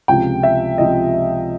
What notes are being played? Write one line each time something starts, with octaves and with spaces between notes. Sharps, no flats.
C#2 C3 F3 G5
E5
C#2 C3 F3 D#5